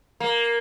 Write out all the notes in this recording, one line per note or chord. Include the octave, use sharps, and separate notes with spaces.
A#3